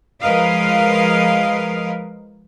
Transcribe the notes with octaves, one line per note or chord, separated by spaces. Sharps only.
F3 G#3 A#4 B4 D#5 F5